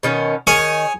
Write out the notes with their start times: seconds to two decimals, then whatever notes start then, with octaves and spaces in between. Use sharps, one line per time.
0.03 B2 D#3 C#4
0.47 D#3 G#4 C#5 G#5